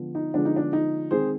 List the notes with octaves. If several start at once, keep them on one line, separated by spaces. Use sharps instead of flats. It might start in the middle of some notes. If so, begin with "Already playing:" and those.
Already playing: D3 F3 G#3 B3
D#4
D3 F3 G#3 B3 D4
D#4
D4
D#4
D#3 G#3 C4 G#4 C5